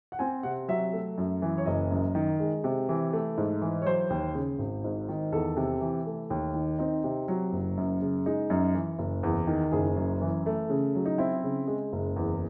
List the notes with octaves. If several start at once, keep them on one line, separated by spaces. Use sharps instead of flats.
F#5
C4 G#5
C3 F#5
F#3 E5
A3
F#2
E3
C#5
F#1 D#5
F#2
D#3
G#3
C3
E3
A3
G#2
E3
C#5
F#3 C5
D#2
C#3
G#1
G#2
D#3
E2 A4
C3
E3
A3
D#2
D#3
C4 D#4
C3
F#3
F#1
F#2
C#3
G#3 D#4
F#2
E3
F#1
E2
D#3
F#1 G#4
F#2
E3
A3
C#3
F#3
D#4
C4 E4
C#3
G#3
F#1
E2